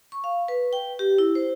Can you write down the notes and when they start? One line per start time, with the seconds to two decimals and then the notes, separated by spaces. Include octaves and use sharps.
0.12 C#6
0.24 F5
0.48 B4
0.73 G5
0.99 G4
1.18 E4
1.35 C5